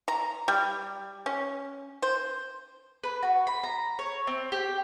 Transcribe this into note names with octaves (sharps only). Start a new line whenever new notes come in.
A#5
G3
C#4
C5
B4
F#4
B5
A#5
C#5
C4
G4